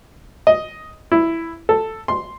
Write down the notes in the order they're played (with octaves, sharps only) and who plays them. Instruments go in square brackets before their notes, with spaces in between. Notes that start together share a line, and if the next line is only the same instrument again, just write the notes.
[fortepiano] D#5
E4
A4
C6